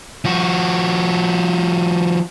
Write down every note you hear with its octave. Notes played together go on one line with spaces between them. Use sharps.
F3 F#4